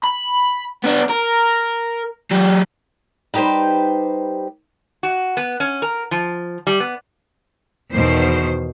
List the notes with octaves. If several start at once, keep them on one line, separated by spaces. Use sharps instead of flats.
B5
B3 D4
A#4
F#3 G4
G3 D#4 G4 B4 C5
F#4
B3
C#4
A#4
F3
G3
B3
E2 B2 D#3 C5